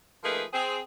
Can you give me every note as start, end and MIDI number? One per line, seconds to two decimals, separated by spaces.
0.24 0.43 53
0.24 0.43 57
0.24 0.43 58
0.24 0.43 63
0.24 0.43 68
0.24 0.43 71
0.53 0.79 60
0.53 0.79 68